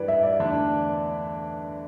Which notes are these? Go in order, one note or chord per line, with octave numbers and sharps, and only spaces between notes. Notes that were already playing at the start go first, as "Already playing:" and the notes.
Already playing: G2 E3 G3 B4 D5
E5
D5
E2 D3 A3 D4